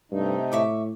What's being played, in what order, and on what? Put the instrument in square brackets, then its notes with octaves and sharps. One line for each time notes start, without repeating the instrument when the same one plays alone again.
[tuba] G2 [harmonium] C3 A3 D#4
[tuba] A2 [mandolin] E5 C#6 D6